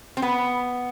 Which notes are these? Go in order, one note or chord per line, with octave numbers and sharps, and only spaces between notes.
C4
B3